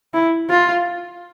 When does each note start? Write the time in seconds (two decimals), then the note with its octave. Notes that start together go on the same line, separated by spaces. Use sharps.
0.14 E4
0.50 F4